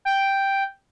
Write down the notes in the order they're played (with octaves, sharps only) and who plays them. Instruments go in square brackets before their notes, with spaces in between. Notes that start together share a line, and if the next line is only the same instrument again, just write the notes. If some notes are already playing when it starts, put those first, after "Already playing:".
[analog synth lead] G5